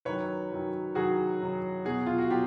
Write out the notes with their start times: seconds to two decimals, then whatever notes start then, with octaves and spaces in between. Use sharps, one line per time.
0.05 F#2 D#3 F#3 B4 C#5
0.51 F#2 D#3 F#3
0.95 F#2 D#3 F#3 F#4 G#4
1.41 F#2 D#3 F#3
1.85 E2 B2 F#3 F#4 G#4
2.07 F4
2.18 F#4
2.31 B2 F#3 F4 G4